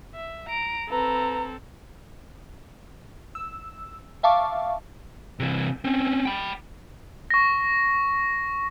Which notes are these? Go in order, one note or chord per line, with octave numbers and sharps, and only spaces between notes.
E5
A#5 D7
C4 A4 B4 A#5
E6
E5 F5 A5 C#6 D6
C3 E3
C4 C#4
G5 B5
C#6 A#6